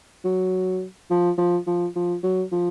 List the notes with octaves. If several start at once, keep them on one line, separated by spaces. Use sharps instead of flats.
F#3
F3
F3
F3
F3
F#3
F3